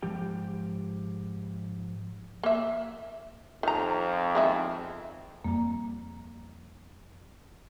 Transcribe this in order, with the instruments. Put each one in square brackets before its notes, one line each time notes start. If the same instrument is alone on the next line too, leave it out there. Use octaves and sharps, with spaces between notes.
[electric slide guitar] G#2 F3 G4 G5
[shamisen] A#3 E5
[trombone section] F2 [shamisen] D#3 A#5
[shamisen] D#3 G#3 E4
[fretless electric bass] F2 G3 [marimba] A#3 A#5